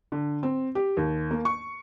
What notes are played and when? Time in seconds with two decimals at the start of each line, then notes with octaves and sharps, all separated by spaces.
0.12 D3
0.43 C4
0.75 G4
0.97 D#2
1.31 A#3
1.45 C#6